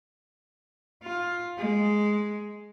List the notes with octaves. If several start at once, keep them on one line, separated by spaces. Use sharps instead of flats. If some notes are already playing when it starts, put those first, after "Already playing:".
F4
G#3